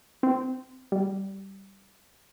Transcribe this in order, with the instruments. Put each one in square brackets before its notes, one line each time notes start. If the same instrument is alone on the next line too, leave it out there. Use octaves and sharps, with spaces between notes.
[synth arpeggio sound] C4
G3